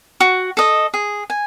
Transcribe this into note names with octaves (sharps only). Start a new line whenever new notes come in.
F#4
A4 D#5
G#4
G#5